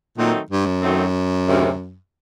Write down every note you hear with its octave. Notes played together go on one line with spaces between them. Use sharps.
A#2 D#3 F#3 A3 C4 D#4
G2
F#2
D#3 F#3 A3 C4 D#4
D2 C3 D#3 G#3 C#4